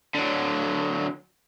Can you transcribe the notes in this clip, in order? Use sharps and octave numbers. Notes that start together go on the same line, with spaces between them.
D3 F#3